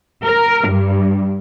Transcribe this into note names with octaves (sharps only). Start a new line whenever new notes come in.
A#4
G2